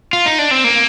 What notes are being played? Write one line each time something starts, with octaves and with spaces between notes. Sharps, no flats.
F4
D#4
D4
C4
A#3